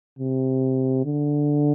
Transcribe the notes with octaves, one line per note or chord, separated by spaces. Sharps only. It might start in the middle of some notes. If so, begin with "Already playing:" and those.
C3
D3